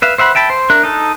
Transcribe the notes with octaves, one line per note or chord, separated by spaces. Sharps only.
B4 E5 F5
C5 E5 F#5 B5
E5 G5 A5 B5
C5
D4 A#4 E5 F#6
D#4 A4